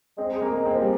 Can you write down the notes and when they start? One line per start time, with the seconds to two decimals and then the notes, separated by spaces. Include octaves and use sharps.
0.17 G#3 C4
0.36 G#3
0.42 A#3
0.54 G#3 A#3
0.65 C4
0.72 F3
0.81 G3